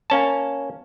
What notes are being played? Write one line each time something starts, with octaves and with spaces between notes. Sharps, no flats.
A#3 C#4 A5